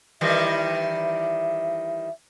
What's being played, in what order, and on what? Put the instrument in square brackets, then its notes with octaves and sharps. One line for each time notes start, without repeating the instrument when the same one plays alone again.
[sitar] D#3 E3 G3 [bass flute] E5